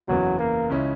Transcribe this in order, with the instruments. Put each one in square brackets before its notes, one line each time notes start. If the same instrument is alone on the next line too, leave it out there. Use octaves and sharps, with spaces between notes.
[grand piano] F#1 E2 C#3 E3 B3 [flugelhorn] F#3
[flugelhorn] A#3
[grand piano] C#2 C#3 G#3 C#4 E4